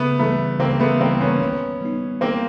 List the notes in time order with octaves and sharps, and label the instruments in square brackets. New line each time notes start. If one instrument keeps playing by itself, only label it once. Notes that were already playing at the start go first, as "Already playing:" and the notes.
Already playing: [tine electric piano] C#3 [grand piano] A3 B3
[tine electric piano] E3 G3 [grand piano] A3 B3
[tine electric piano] C#3 [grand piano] A#3 C4
[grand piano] A3 B3
[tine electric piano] E3 G3 [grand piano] A#3 C4
[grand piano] B3 C#4
[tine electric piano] D#3
G3 B3 D#4
[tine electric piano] D#3 [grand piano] A#3 C4